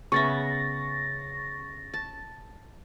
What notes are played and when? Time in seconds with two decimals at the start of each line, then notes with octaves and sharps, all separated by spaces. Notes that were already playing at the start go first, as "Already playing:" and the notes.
0.12 C#3 B3 E5 C#6 A6 A#6
1.94 A5